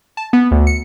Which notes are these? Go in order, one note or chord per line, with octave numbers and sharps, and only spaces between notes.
A5
B3
D2
C#7